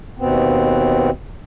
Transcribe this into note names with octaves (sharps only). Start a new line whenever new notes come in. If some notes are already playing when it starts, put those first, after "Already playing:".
D#2 B2 B3 C4